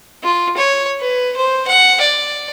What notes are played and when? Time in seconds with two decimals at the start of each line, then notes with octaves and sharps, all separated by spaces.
0.24 F4
0.57 C#5
1.00 B4
1.37 C5
1.68 F#5
2.01 D5